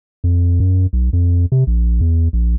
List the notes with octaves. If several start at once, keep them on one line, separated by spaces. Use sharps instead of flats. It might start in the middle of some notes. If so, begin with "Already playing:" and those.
F2
F#2
B1
F2
C3
A#1
E2
A#1